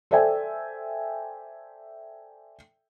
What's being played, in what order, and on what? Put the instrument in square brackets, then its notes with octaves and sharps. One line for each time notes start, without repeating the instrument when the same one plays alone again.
[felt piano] A4 C5 D5 E5 G5 G#5